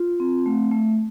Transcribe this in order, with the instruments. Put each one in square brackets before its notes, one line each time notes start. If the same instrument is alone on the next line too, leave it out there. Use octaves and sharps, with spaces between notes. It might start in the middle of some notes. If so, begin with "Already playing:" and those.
Already playing: [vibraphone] F4
C4
A3
A3